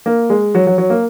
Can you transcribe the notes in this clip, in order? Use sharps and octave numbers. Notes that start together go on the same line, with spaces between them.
A#3
G#3
F#3
F#3
F#3
A#3